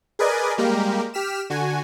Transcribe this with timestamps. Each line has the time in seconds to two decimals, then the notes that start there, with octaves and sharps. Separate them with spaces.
0.19 G#4 A#4 B4 D5 D#5 G#5
0.58 G3 G#3 A#3 G4 A#4
1.14 G4 F6 B6 E7
1.50 D3 F#4 G#5